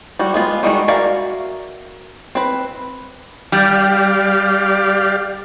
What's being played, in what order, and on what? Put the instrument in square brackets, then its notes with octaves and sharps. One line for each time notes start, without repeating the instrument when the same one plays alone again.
[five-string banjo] G3 F#4
G#3 B3 F4
D#3 G3 G#3 F#4
F#4 A#4 D5 E5 F5
C4 B4
[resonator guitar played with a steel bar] G3 [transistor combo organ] G4 D5 F5